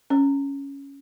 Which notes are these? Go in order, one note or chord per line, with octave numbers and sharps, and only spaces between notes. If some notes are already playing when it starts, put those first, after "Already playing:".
C#4